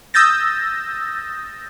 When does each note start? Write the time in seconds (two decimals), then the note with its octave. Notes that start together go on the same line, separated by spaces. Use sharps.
0.14 D#6 E6 G6 A6 A#6